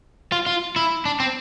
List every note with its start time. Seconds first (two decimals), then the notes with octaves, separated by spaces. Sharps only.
0.32 F4
0.46 F4
0.76 E4
1.05 D4
1.20 C4